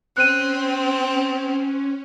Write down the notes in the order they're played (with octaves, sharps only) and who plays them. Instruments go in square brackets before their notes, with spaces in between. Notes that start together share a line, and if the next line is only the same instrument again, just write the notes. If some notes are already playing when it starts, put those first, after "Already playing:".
[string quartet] C4 [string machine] C#4 [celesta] F#6 D#7